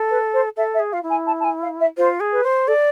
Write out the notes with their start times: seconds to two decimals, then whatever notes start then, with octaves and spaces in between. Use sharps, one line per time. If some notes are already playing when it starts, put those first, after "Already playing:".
Already playing: A4
0.10 B4
0.33 C5
0.56 A4 E5
0.74 E5
0.79 G#4
0.92 F4 F5
1.03 E4
1.10 G#5
1.26 A5
1.40 A5
1.44 G#5
1.62 F5
1.80 E5
1.97 F4 C5
2.20 G#4
2.32 B4
2.43 C5
2.67 A4 D5